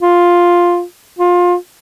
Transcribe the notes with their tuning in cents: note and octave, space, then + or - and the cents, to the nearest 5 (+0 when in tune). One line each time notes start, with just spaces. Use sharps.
F4 +5
F4 +20